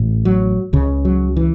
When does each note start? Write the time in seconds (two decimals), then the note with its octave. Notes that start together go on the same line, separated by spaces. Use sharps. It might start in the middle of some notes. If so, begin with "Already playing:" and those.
Already playing: A1 A2
0.25 F#3
0.73 C#2 C#3
1.05 F#3
1.36 E3